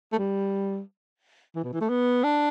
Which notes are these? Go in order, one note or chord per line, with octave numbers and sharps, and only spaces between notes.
A3
G3
E3
B2
E3
A3
B3
D4